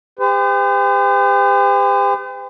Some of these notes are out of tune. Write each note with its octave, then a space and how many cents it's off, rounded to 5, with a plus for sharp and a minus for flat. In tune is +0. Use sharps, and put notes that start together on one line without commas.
G4 +40 C5 -45